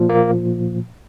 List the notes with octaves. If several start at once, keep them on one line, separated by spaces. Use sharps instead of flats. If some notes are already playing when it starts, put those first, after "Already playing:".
Already playing: A#2 F3
A#3